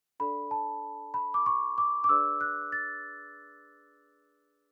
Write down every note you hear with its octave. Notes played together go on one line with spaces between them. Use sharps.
D4 A4 D5 B5
A5
B5
D6
C#6
D6
D6
D4 G#4 B4 D5 E6
F#6
A6